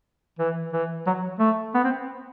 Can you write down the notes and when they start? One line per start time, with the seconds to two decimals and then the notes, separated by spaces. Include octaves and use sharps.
0.39 E3
0.73 E3
1.07 F#3
1.39 A3
1.74 B3
1.84 C4